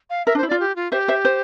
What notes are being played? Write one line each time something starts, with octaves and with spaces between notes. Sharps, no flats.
F5
A#4 E5
D4
C5
E4
F4 D5
G4
F4
G4 C5 E5
C5 E5
C5